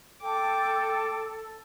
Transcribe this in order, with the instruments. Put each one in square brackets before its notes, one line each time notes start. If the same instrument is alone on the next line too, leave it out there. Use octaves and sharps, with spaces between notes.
[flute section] A4 [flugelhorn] G5 [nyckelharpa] D6